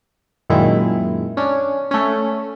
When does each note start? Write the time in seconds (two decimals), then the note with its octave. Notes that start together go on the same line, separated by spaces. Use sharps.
0.50 F#2 A#2 D#3 G#3 E4
1.37 C#4 D4
1.91 A3 C#4